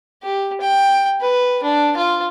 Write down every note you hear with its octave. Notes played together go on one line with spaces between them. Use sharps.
G4
G5
B4
D4
F4